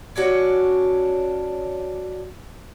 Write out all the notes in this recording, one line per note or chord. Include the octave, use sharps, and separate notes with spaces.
C#4 D4 F#4 C#5